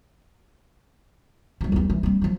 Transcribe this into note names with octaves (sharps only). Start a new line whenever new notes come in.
F3 G3
E2 G3
E3
G3 C4
F3 F#3